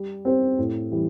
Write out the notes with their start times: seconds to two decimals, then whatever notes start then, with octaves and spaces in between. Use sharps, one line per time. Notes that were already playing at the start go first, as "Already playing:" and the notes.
Already playing: G3
0.25 C4 G4 C5
0.58 A2
0.92 E3 G3